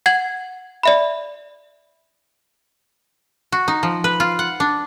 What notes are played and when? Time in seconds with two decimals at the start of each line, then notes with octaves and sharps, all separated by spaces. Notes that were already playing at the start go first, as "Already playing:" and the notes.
0.06 F#5 G#6 F#7
0.83 D5 E5 B5
3.52 F#4
3.68 D#4
3.83 F3
4.04 B4
4.20 F4
4.39 F#5
4.60 D4